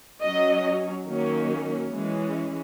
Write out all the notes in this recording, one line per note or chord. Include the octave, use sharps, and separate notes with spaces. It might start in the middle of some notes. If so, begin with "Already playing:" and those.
F#3 C#4 D#5
D#3 F#3 A#3 C#4
E3 G#3 C#4